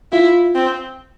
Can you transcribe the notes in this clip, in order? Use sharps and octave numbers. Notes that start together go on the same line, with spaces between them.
E4 F4
C4